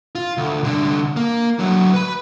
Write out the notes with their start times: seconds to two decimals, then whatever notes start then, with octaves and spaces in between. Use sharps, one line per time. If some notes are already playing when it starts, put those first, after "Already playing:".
0.15 F4
0.37 D2
0.63 C2 D3
1.16 A#3
1.59 D3 F#3
1.94 B4 B5